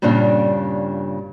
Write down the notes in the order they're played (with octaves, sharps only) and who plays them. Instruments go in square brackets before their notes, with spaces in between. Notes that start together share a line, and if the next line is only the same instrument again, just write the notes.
[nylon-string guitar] G2 A#2 C#3 G3 D4